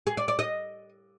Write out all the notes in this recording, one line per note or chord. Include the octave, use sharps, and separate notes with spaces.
G#4
D5
D5
D#5